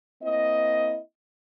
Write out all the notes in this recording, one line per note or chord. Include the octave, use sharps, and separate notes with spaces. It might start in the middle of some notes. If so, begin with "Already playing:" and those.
A#3 C4 E4 D#5